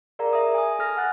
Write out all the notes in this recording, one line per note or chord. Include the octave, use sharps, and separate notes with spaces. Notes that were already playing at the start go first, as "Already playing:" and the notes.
G#4 A#4 D5 F5 A#5
E5 D#6
G#5 D#6
A4 F6 A#6
F#5 G#5 F#6 A6